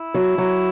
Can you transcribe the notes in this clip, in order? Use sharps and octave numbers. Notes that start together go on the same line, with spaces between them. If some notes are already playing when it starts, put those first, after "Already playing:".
Already playing: E4
F#3
F#3